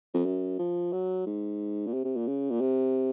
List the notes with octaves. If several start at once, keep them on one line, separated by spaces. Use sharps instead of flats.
F2
F#2
F3
F#3
G#2
A#2
C3
C3
A#2
C#3
A#2
C3